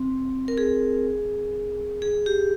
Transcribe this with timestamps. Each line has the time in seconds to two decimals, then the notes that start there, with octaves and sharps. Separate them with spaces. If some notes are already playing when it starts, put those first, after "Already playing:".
Already playing: C4
0.48 A#4
0.58 G#4
2.02 G#4
2.26 G4